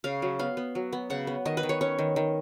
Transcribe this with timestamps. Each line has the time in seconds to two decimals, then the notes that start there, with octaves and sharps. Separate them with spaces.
0.04 C#3 F5
0.22 F#3
0.39 B3 F5
0.57 B3
0.75 F#3
0.93 B3
1.10 C#3 F#5
1.27 B3
1.45 D#3 D#5
1.57 B4
1.63 D#3
1.69 C#5
1.81 C#4 C#5
1.99 D#3
2.16 D#3